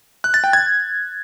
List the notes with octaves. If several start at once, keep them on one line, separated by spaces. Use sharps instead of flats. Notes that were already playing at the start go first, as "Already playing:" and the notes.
F#6
A6
G5
G#6